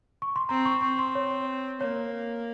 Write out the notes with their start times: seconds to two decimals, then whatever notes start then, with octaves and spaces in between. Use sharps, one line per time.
0.22 C#6
0.36 C6
0.49 C4 A#5
0.65 C#6
0.82 C4 C#6
0.99 C6
1.15 C#5
1.80 A#3 C#5